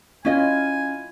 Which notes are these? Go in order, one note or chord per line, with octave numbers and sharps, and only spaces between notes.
C#4 E4 F4 D#5 F5 G#5